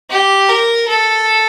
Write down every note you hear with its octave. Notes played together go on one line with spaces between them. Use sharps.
G4
A#4
A4